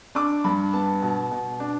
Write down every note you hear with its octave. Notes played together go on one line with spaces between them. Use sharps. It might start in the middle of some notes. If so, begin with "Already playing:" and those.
D4 D6
G2 B5
B3 A5
B2
B2
D4